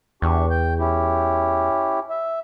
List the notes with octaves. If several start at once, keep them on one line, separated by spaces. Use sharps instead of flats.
E2 D4 G4 C#6
G5 G6
C#4 E4 G4
E5